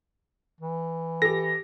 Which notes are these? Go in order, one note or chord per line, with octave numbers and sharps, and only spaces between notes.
E3
G4 A4 A#6